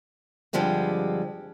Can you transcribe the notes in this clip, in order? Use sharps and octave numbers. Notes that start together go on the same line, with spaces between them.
G2 D3 F3 G3 G#3 C4